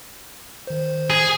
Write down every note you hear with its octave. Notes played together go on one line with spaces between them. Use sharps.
D#3 C5
G#4